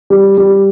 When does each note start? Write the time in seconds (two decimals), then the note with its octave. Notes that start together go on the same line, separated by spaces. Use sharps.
0.10 G3
0.37 G3